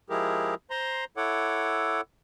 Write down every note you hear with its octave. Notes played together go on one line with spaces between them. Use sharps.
F3 G#3 E4 G4 G#4 A#4
C5 A#5 C6
E4 A4 C#5 F#5 D6